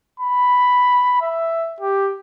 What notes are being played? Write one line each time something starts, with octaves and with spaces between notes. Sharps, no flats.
B5
E5
G4